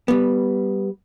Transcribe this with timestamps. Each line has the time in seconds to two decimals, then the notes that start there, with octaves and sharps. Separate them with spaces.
0.08 G3 B3